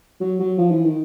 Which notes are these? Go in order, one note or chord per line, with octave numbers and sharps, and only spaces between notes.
F#3
F#3
F3
E3
D#3